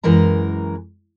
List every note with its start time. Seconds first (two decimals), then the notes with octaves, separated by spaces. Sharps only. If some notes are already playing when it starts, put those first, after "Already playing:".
0.04 F#2 E3 G#3 A#4 A#5